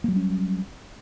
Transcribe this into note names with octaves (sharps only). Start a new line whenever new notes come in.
F#3 G3 A#3 C#4